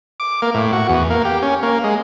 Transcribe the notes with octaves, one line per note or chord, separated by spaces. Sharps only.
D6
A#3
A2
F#4
E2
A#3
G4
C#4
A#3
G#3